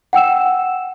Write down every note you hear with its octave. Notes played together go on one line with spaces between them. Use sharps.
F#5 G5 E6 E7